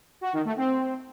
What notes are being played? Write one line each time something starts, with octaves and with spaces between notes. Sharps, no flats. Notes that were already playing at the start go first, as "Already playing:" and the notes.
F#4
D#3
A3
C4